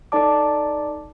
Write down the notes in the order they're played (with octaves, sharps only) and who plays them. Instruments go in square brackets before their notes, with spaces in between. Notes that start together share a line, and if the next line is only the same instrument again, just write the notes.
[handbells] D#4 A4 D5 A5 D6